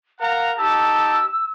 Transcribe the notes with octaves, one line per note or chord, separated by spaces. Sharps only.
A#4 F5 F#5 A#5
D#4 G4 A5 E6